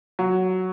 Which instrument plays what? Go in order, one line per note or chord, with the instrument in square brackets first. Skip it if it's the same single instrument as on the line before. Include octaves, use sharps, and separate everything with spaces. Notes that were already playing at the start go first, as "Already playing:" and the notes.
[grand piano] F#3